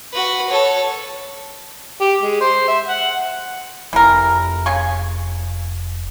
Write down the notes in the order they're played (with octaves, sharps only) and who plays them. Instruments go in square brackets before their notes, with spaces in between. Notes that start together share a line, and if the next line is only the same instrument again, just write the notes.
[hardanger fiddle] F#4 B4
A4 C#5
[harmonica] G4
G#3
C5
E5
F#5
[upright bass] F1 [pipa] E3 A#4
[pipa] C#3 G#5 C#6